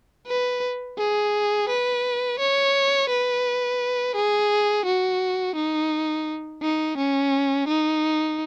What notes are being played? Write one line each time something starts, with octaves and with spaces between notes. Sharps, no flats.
B4
G#4
B4
C#5
B4
G#4
F#4
D#4
D#4
C#4
D#4